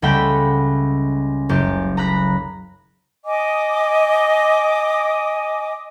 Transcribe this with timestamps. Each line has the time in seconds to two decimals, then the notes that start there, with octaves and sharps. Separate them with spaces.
0.02 C#2 G3 A3 F#5 G5 B5
1.49 F#1 G4
1.97 A#5 B5 F#6 A#6 B6
3.25 D#5 G#5 D6 D#6